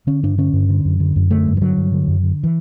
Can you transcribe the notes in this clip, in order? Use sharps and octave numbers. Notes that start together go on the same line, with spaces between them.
D3 C#4
G2 D4
D3 C#4
G2
D3
F#2
D3
F#2
D3 A3
G2
E3
D3 F#3
G2
D3
F#2
D3
E3